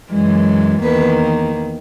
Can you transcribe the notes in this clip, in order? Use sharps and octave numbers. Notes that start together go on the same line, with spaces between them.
F#2 E3 G#3
E2 D#3 A#3 B4